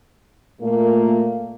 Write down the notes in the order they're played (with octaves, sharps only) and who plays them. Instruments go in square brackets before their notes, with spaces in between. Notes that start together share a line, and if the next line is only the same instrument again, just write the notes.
[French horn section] A#2 A3 A#3